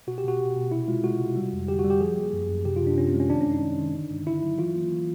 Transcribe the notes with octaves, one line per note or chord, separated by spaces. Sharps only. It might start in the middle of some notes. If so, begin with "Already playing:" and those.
B2 F#4
G4
B2 F#4
B2
B2
C3 E4
G#3 F4
G#3 F#4
C3
G3
F2
D3 G4
F#4
G3
G4
F3 G#4
A#3
F#2
F#2
C3 G4
F4
C3
D4
C3 C#4
C4
G#3
C#4
D#3 D4
C#4
F#2
D#4
D#3
D#3
D3
G2
D3 E4
F#3
E3 F4
A#3
E3